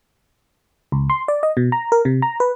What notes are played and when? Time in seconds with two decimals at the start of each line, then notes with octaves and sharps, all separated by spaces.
0.92 C#2
1.10 C6
1.28 D5
1.43 D#5
1.57 B2
1.72 A#5
1.92 A#4
2.05 C3
2.22 A#5
2.40 B4